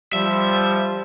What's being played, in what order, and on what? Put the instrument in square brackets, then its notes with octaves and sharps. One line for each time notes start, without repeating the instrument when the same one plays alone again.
[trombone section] F3 G3 [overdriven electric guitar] E5